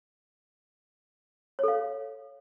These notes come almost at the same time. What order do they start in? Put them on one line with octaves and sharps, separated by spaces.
C#5 A4 F5